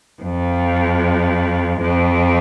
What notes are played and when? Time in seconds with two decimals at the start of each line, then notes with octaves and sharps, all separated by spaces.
0.22 F2
1.81 F2